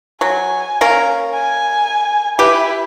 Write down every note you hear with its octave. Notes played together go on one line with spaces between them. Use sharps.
F#3 G#5
A#3 C#4 A#4
G#5
E4 G4 B4